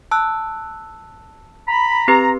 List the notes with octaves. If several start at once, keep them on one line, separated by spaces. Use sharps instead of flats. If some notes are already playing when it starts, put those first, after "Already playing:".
A5 E6 F#6
A#5 B5
C4 G4 B4 A#5